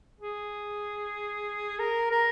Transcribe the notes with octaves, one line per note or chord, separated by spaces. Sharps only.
G#4
A#4
A#4